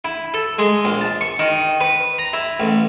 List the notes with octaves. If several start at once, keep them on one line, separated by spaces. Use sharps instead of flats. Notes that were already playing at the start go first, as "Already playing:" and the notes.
E4
A4
G#3
A#1
A5
C#6
D#3
B4
A#5
E4
A1